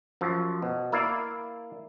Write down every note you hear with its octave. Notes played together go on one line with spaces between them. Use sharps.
F#2 F3
B2
A#3 E4 D5 F5